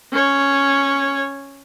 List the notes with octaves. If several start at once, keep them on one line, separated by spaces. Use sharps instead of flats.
C#4 C#5